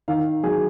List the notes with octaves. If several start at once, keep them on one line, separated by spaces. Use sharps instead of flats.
D#3 F5
F#3 G#4